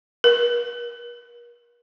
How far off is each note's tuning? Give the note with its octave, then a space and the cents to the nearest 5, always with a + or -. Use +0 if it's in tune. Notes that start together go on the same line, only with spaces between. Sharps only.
A#4 +40